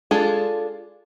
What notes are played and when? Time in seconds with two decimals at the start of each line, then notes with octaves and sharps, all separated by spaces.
0.11 G#3 D4 F4 G#4 A4